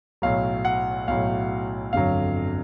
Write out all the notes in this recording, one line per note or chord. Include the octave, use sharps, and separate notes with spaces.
B1 A2 F#3 F5
F#5
B1 A2 F#3 F5
G1 F2 D3 F#3 F5